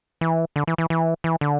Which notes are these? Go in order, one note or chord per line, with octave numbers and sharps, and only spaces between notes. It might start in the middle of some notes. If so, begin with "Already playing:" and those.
E3
D3
E3
E3
E3
E3
D3